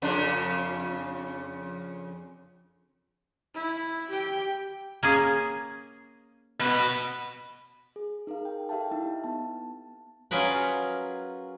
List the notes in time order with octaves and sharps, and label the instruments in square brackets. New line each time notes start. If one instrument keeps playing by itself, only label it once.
[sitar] F2 C#3 D4
[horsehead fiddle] E4
G4 G5
[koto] A#3 C#4 G#4
[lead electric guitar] B2 B4
[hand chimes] G#4
D#4 G#4 A#4 F5
G5
G4 A4 E5 F5 G5 A5
D#4 E4 E5
B3 A5
[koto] F#3 C#4 F4 G#4 A#4 B4